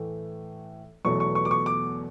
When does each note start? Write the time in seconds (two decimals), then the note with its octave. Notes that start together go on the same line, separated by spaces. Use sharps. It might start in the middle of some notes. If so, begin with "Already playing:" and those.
Already playing: A2 E3 A3
1.05 E2 B2 F#3 A3 C#6
1.20 C#6
1.35 C#6
1.45 D6
1.51 C#6
1.66 D6